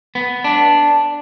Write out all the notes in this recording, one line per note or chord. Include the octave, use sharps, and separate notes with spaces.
B3
D4